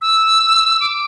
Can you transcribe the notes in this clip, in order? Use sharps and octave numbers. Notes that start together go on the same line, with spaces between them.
E6
D6